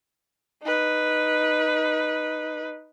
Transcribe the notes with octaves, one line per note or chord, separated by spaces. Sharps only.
D#4 B4